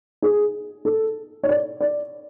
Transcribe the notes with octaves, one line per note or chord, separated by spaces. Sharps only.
G#4
A4
C#5
D5
D5